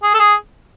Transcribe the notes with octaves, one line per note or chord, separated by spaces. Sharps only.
G#4
A4
G#4